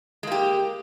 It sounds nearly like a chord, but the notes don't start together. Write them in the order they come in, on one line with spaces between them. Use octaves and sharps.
G#3 A#3 G4